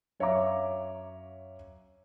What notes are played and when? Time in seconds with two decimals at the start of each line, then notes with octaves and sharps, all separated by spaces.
0.20 F#2 C#5 E5 F5 A#5 D6